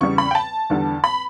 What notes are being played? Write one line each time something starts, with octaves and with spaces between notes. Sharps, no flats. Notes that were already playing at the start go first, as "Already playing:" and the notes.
E2 C#3 G3 C#6
B5
G5
A5
E2 D3 G3
B5